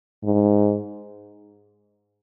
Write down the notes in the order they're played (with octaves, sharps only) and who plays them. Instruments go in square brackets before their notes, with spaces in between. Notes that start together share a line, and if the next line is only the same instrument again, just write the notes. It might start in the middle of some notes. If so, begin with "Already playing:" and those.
[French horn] G#2